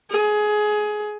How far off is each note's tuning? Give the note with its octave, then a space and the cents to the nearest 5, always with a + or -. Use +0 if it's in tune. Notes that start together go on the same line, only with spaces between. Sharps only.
G#4 +20